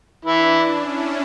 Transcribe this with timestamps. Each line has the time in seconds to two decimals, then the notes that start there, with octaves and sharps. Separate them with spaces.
0.25 E3 D4 E4
0.67 C#4 E4